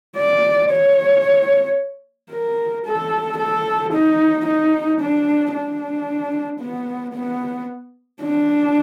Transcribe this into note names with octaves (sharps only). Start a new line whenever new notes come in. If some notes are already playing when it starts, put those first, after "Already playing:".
D5
C#5
A#4
A4
A4
D#4
D#4
D4
D4
B3
B3
D4